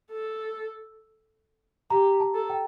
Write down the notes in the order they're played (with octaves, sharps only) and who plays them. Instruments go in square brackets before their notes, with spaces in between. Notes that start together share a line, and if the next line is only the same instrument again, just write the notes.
[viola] A4
[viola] G4 [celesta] A#5
[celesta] A5
[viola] A4
[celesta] G5